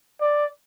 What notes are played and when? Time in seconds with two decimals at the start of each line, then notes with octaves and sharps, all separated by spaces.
0.21 D5